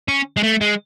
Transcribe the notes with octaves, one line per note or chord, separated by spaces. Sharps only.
C#4
G#3
A3
G#3